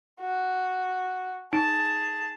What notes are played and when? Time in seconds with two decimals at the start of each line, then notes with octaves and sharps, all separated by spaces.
0.20 F#4
1.53 D#4 G#4 A5